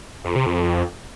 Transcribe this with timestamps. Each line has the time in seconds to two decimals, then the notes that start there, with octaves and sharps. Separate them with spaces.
0.24 F2
0.35 C3
0.46 F2